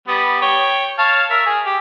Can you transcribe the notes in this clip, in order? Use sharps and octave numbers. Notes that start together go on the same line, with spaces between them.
G3 B3
C#5 G5
C#5 F5 A5
A#4 E5
G#4
G4